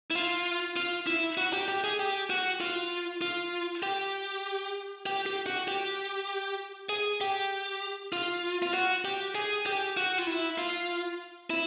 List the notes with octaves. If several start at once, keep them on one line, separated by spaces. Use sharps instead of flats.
E4
F4
F4
E4
F#4
G4
G4
G#4
G4
F#4
F4
F4
G4
G4
G4
F#4
G4
G#4
G4
F4
F4
F#4
G4
G#4
G4
F#4
F4
E4
F4
E4